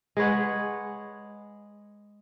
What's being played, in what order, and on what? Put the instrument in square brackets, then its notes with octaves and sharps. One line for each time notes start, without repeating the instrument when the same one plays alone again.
[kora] G#3 B4 C#5 F#5